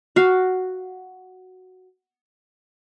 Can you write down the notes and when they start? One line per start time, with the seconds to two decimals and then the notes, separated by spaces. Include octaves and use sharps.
0.16 F#4 F5